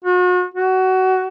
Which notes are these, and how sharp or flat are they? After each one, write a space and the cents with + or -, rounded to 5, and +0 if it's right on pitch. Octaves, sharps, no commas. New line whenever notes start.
F#4 -40
F#4 +20